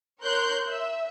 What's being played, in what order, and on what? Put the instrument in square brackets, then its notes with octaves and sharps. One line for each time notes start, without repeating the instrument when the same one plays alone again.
[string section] A#4 C#5 C6 F#6 G6
E5